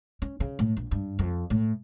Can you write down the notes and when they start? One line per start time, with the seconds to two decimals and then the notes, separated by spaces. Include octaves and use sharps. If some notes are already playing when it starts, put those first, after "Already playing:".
0.22 C#4
0.40 C#3
0.59 A2
0.77 A#1
0.91 G2
1.19 F2
1.50 A2